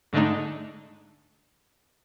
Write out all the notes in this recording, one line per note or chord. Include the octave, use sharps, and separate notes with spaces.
G#2 D3 G#3 A3 D4 D#4